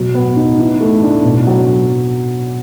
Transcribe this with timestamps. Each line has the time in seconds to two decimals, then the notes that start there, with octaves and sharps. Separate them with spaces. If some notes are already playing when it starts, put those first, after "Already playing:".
Already playing: B2 F#3
0.15 B3
0.36 D#4
0.59 E3
0.80 A3
1.02 D4
1.24 B2
1.47 F#3